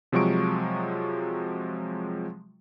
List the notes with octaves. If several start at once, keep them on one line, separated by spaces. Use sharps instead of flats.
C3 F3 F#3 G#3 C#6 D7